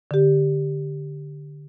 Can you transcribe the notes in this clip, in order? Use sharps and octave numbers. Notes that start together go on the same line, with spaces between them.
D3 G4